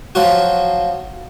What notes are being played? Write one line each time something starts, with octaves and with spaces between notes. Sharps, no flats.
F3 F#3 F4 F#4